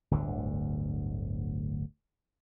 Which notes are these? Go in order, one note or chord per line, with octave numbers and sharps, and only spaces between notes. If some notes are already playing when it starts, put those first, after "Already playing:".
D1 G1 D2 D3